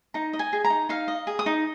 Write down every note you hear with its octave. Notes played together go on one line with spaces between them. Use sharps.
D#4 A#5
D#5
G#5
G#4
A#5
D#4
D#4 F5
D#5
G#4
D#6
D#4